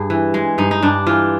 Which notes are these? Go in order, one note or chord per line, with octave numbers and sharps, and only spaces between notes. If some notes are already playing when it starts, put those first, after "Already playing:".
Already playing: G2 G#4
E3
G#3
G2 D#4
D#4
G2 D4
E3 F4